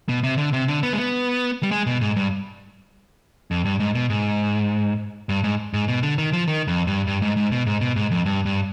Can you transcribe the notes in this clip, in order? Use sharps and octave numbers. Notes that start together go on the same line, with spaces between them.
B2
C3
D3
C3
D3
B3
G#3
B3
G3
G#3
B2
G#2
G2
F2
G2
G#2
B2
G#2
G2
G#2
G#2
B2
D3
D#3
F3
D#3
F2
G2
G2
G#2
G#2
B2
G#2
B2
G#2
F2
G2
G2